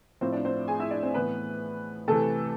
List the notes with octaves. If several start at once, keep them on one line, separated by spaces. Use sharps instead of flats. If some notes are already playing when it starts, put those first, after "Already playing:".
A2 F3 C4 C5
D4 D5
C4 C5
G#4 G#5
E4 E5
D4 D5
C4 C5
A2 E3 B3 B4
C3 E3 A3 A4